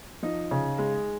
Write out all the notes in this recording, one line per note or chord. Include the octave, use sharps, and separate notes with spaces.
F3 D#4
C#3
G#3